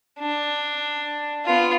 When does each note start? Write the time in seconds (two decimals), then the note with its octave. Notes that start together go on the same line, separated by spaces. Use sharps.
0.19 D4
1.45 B3 F4